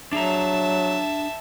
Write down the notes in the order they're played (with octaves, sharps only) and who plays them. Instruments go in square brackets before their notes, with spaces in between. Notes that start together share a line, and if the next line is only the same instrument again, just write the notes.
[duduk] F#3 [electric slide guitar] D4 G#4 A#5 [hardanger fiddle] E5 A5